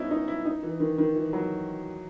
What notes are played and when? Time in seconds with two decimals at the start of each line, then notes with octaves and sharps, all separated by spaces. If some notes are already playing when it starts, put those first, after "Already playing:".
Already playing: B3 C#4 D#4 E4
0.11 D#4
0.28 E4
0.46 D#4
0.63 E3
0.80 D#3
0.98 D#3
1.16 E3
1.33 F#3